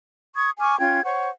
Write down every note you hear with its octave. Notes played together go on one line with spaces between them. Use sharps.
C#6 D#6 G#6
G#5 C#6 D6 F6
C#4 F4 G5 G#6
C5 C#5 F#5 C#6